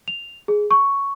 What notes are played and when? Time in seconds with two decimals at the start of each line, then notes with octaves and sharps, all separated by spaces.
0.08 F7
0.48 G#4
0.71 C#6